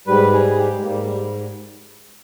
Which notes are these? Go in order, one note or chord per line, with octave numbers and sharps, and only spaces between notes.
G#2 G3 B4
G#4
G4
G#3
G#2 G3 A#3
G3